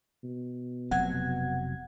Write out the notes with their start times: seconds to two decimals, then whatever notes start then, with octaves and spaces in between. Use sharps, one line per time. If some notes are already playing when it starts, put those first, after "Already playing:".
0.24 B2
0.91 F1 C3 F#3 F#5 G#6